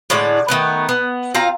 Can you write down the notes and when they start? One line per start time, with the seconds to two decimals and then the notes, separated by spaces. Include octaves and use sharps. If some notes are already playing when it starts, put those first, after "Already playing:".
0.10 A2 D3 G#3 D5
0.48 D#3 A3 B3
0.89 B3
1.35 C4 F4 F5 A#5